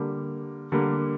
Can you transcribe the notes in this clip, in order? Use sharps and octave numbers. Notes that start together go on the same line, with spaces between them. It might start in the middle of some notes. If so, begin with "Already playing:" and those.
Already playing: D3 G3 A#3
D3 G3 A#3